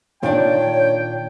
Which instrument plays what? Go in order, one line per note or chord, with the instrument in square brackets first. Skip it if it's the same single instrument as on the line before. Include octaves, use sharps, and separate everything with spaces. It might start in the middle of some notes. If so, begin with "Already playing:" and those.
[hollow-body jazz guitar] A#2 D#3 D4 [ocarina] C#5 [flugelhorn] G5